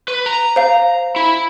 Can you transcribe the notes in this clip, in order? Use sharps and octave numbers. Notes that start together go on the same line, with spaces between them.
B4
A#5
C5 F5
E4